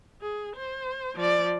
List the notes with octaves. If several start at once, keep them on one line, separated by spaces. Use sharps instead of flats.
G#4
C5
F3 D5